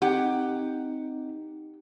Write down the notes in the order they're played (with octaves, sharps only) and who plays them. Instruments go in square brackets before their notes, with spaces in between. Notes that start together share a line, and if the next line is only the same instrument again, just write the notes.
[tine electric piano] C4 D#4 [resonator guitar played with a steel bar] G4 F#5